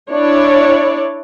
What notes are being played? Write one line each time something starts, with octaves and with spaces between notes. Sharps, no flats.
D4 E4 C#5 D5